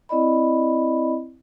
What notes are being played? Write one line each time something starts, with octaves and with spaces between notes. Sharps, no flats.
C4 E4 D5 D#5 B5